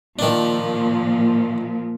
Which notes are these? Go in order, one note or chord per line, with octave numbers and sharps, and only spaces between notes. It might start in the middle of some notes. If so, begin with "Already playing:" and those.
A#2 D#3 F3 A#3 D4